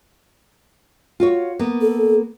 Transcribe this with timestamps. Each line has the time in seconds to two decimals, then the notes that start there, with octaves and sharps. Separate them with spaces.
1.20 F4 F#4 C#5
1.59 A#3 B3
1.82 A4